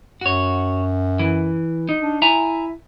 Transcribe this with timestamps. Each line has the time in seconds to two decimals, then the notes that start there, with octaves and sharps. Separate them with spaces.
0.21 F#2 F#4 C#5
1.19 E3
1.89 D#4
2.02 D4
2.22 E4 E5 G#5 A#5